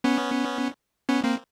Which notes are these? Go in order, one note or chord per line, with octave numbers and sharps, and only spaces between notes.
B3 C#4
B3 C#4
A#3 C4